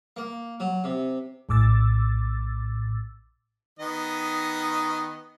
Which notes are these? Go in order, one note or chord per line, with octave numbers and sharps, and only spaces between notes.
A#3
F#3
C3
A#1 A2 D6 E6 A6
D#3 B3 D#5